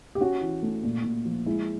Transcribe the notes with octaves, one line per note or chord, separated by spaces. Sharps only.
G4
C#4 F#4
E3
A3
A#2
A#2
F3
G#3 E4